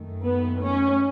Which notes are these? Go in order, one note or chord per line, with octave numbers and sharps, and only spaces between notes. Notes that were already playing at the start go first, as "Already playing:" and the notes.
Already playing: F#2 D#3 A3
B3
C#4